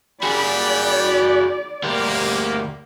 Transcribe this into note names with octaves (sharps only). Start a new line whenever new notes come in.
G3 F#4 G#4 D5 B5
D2 G3 A#3 G4